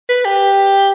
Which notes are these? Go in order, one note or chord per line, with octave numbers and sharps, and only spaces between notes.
B4
G4